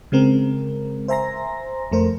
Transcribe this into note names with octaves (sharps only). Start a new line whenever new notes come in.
C#3 G#3 C4 A#4
C5 E5 G#5 A#5 C6 A#6
F2 A3 A#4 C5